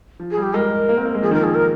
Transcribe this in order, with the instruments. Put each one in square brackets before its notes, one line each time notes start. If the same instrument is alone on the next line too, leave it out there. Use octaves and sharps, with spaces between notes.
[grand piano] F3
[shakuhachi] G#4
[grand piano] G3
[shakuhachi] G4
[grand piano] G#3 [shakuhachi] A#4
[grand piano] A#3
C4
A#3
G#3
[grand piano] F3 [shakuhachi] G#4
[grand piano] D#3
[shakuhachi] A#4
[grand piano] F3
[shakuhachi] G#4
A#4